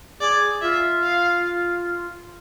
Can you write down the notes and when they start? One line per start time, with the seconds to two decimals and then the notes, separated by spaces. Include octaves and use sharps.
0.20 G#4 D5
0.61 F4 E5
1.03 F5